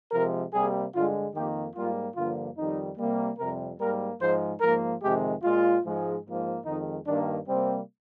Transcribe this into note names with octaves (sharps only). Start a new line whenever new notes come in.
C3 F3 G#3 A#4
C3 G3 A#3 G#4
G2 D3 G#3 F4
F2 D#3 A#3 G4
G#2 G3 A#3 F4
G2 D3 F3 A#3 F4
F2 D#3 G3 D#4
C3 G3 A#3
F2 C3 G3 A#4
G#2 G3 A#3 A#4
G#2 F3 G#3 C5
G#2 F3 A#3 A#4
F2 C3 D#3 G#3 G4
A#2 G#3 F4
G#2 F3 G#3
G#2 F3 A#3
F2 D#3 G#3 D#4
G2 D#3 A#3 D4
C3 G3 A#3 C4